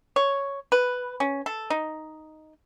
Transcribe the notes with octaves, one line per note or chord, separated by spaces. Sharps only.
C#5
B4
C#4
A4
D#4